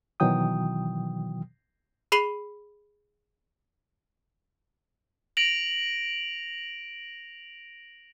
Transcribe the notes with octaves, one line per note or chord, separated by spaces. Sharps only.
B2 D#3 E3 F#3 G5 D#6
G#4 B5 C7 D#7 F#7 G7
A#6 D7 F7 F#7